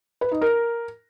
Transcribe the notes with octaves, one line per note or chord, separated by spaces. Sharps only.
B4
D#4
A#4